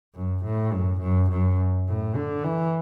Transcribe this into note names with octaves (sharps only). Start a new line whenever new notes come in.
F#2
A2
F#2
F#2
F#2
A2
D3
E3